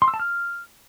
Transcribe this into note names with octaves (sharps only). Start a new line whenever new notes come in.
C6
E6
A5
F6